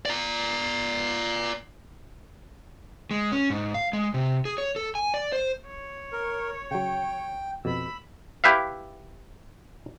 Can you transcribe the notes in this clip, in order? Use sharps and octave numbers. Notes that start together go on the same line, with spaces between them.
D5 A#5
G#3
C#4
G#2
F5
G#3
C3
G#4
C#5
A4
G#5
D5
C5
C#5
A#4
C#3 F#3 G5
F2 B2 B5 E6
E4 G4 B4 E5 F5